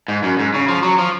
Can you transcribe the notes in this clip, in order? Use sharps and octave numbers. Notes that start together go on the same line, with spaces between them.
G#2
F#2
G#2
C#3
F3
F#3
F3